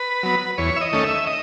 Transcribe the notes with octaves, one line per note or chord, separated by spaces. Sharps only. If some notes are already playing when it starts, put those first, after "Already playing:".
Already playing: B4
F#3 B3
E2 C#5
E5
D#5
D#3 A3 C#4
E5
D#5